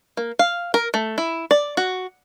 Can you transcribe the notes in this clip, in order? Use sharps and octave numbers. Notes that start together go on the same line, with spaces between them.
A#3
F5
A#4
A3
E4
D5
F#4